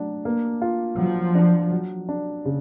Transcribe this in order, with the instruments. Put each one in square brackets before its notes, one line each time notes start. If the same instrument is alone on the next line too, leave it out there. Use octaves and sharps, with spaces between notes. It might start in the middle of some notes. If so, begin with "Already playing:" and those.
Already playing: [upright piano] F#3 A3 D4
A#3
F4
[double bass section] F3 [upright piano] F#3
[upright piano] D4
F#3
D4
C#3